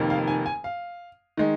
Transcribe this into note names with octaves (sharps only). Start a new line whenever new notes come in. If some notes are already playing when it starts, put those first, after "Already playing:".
Already playing: F1 F2 D#3 A#3
F5
G#5
G#5
F5
D#3 G#3